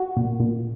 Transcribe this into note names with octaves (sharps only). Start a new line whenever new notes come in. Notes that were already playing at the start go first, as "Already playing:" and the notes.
Already playing: F#4
A#2
A#2